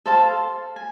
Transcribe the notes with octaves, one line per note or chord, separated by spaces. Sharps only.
A4 C5 F5 A5
G#5